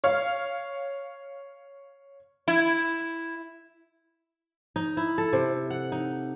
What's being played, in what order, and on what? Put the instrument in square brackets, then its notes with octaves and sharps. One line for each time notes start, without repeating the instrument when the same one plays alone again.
[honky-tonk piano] C#5 F5
[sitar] E4
[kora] D#4
E4
A4
C3
F#5
D#4